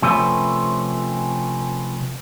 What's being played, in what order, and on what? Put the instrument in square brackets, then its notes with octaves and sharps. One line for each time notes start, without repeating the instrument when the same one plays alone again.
[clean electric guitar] C3 F3 A3 C#4 B4 C5